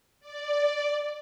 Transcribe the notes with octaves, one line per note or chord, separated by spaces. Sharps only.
D5